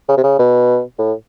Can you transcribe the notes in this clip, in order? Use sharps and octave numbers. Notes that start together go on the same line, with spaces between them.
C#3
C3
C#3
B2
A2